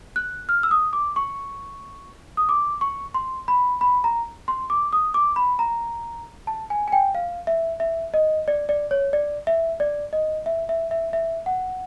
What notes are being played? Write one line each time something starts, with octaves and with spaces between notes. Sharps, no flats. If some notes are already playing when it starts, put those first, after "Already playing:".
F#6
F6
E6
D#6
D6
C#6
D#6
D6
C#6
C6
B5
B5
A#5
C6
D6
D#6
D6
B5
A#5
A5
G#5
G#5
G5
F5
E5
E5
D#5
D5
D5
C#5
D5
E5
D5
D#5
E5
E5
E5
E5
F#5